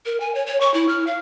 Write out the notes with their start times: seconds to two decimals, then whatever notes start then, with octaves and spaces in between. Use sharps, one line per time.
0.06 A#4
0.20 G#5
0.35 C#5
0.46 C#5
0.61 C#6
0.74 E4
0.89 F6
1.07 F5